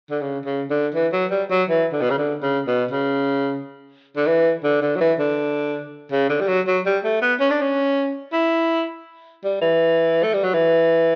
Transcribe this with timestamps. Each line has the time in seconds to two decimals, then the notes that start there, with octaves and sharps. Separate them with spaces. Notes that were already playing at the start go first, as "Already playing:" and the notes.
0.10 D3
0.21 C#3
0.46 C#3
0.70 D3
0.95 E3
1.13 F#3
1.31 G3
1.51 F#3
1.69 E3
1.92 D3
2.01 B2
2.10 C#3
2.18 D3
2.42 C#3
2.67 B2
2.91 C#3
4.17 D3
4.27 E3
4.64 D3
4.82 D3
4.96 F#3
5.01 E3
5.19 D3
6.12 C#3
6.29 D3
6.40 G3
6.48 F#3
6.67 F#3
6.86 G3
7.04 A3
7.22 B3
7.40 C#4
7.51 D4
7.61 C#4
8.33 E4
9.44 G3
9.61 E3
10.23 A3
10.34 G3
10.44 F#3
10.54 E3